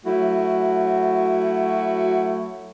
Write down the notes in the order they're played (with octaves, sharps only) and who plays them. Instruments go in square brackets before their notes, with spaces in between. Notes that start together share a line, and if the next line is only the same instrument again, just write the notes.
[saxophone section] F#3 A3 E4 F#4